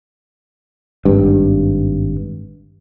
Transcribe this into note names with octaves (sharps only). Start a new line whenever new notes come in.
G#1 G2